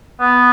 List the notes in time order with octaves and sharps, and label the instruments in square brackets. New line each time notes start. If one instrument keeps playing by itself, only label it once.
[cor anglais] B3